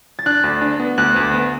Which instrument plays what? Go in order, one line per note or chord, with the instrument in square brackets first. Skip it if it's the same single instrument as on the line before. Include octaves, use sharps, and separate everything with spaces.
[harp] A6
[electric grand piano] D4 [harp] F#6
[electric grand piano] D2
D4
B3
[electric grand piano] D2 [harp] F#6
[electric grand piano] D2
B3